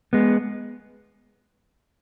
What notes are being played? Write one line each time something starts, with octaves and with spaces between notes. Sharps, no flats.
G#3 B3